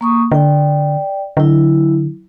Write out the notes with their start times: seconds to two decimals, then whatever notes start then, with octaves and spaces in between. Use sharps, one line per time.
0.01 A#3 C#6 D#6
0.32 D3 D5 G5
1.37 D3 F#3 E4